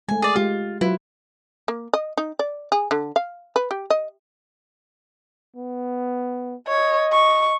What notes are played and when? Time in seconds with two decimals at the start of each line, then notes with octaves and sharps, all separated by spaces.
0.09 G#3 A3 G#5
0.22 G#4 D5
0.36 G#3 F4 G4
0.81 F#3 E4 F4 B4
1.68 A#3
1.93 D#5
2.17 D#4
2.39 D5
2.72 G#4
2.91 D3
3.16 F5
3.56 B4
3.71 G4
3.90 D#5
5.56 B3
6.68 C#5 D#5
7.12 C#6